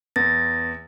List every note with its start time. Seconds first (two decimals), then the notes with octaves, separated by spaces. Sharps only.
0.16 E2 A6 A#6